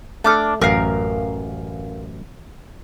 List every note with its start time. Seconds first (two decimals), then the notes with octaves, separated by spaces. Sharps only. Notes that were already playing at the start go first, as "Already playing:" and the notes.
0.24 A3 D4 A4 D6 F6
0.61 A1 F#2 A#4 F5